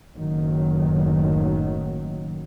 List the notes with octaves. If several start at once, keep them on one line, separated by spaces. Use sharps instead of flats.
F#1 A2 D#3 F#3